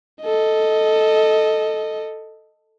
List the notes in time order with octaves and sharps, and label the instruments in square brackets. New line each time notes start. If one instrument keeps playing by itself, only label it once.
[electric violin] A4 D#5